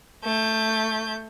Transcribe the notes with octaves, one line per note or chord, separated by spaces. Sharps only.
A3 G6